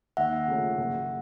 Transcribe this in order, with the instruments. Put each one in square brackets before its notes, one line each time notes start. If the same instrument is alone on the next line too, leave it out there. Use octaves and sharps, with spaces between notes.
[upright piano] D#2 [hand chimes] E5 F#5
[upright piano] C#3 F3 A3 C#4
F#1